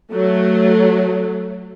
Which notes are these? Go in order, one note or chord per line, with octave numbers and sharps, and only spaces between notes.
F#3 A3